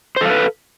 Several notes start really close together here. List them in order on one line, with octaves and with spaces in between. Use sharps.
C5 A4 F5 B4